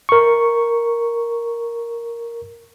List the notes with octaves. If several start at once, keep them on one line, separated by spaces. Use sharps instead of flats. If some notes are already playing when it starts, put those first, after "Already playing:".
A#4 C#6